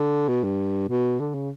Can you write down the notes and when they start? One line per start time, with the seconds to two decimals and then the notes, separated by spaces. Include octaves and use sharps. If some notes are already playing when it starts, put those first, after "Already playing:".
Already playing: D3
0.28 B2
0.43 G2
0.89 B2
1.20 D3
1.34 C#3